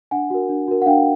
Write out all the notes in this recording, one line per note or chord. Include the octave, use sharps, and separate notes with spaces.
D4 F#5 G#5
F#4 A#4
D4
F#4 A#4
F#5
D4 F5 G5